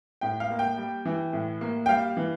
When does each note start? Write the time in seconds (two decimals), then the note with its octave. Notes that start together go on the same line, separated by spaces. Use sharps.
0.21 A2 G5
0.40 F5
0.50 A#3
0.59 G5
0.77 G3
1.05 E3
1.33 A2
1.61 A#3
1.86 G5
1.89 G3 F5
2.17 E3